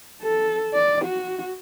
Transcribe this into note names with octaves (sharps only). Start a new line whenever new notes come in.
A4
D5
F#4